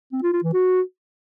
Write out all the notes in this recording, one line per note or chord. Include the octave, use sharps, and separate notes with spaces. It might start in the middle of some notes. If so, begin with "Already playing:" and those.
C4
F4
F4
E3
F#4